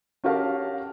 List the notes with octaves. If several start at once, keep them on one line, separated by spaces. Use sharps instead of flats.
C#4 F#4 G4 A#4 F5 A5